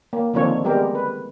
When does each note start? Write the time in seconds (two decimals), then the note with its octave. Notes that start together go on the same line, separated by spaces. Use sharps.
0.13 A#3
0.34 D3 D#3 F3 A#3 C4 C#5
0.64 G3 G#3 B3 G4 A#4
0.95 B4